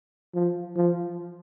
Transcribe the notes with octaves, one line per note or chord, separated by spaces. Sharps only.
F3
F3